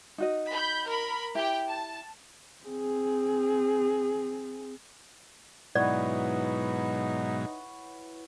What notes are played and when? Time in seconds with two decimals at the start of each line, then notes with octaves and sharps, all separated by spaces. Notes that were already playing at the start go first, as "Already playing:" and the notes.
0.18 D#4 F#4 D#5
0.50 B5 G6
0.85 A#4 B5
1.35 E4 G4 G5
1.68 A5
2.64 C4 G#4
5.75 G#2 B2 E3 F#3 D#4 F#4 C#5 D5